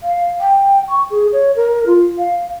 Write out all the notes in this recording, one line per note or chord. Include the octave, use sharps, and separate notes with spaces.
F5
G5
C#6
G#4
C#5
A#4
F4
F5